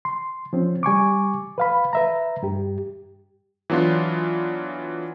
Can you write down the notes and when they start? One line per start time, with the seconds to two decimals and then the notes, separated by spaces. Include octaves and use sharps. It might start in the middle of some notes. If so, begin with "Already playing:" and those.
0.05 C6
0.53 F3 C4 C#4
0.83 G3 G#5 C#6 D6
1.58 B4 F5 B5
1.93 B4 E5 A#5
2.43 G2 G4
3.70 E3 F#3 B3 D4 F4